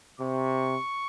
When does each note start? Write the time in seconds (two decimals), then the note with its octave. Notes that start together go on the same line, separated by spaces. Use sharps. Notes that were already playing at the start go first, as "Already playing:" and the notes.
0.20 C3 C#6